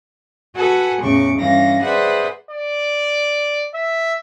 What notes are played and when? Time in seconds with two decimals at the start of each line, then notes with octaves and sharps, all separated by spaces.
0.57 F#4 A4 B4 F#5 G#5
1.02 E2 A2 C#3 C#6 D6
1.38 G2 E3 C#4 F5 A#6
1.83 G#4 B4 C5 D5 E5 F#5
2.51 D5
3.74 E5